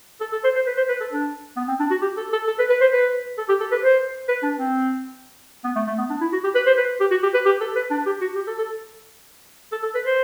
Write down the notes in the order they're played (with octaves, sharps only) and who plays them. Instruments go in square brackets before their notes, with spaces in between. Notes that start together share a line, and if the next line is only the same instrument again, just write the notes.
[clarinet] A4
A4
C5
C5
B4
C5
B4
A4
D4
B3
C4
D4
F#4
G4
A4
A4
A4
B4
B4
C5
B4
A4
G4
A4
B4
C5
B4
D4
C4
B3
A3
A3
B3
D4
E4
F#4
G4
B4
C5
B4
G4
F#4
G4
B4
G4
A4
B4
D4
G4
F#4
G4
A4
A4
A4
A4
B4
C5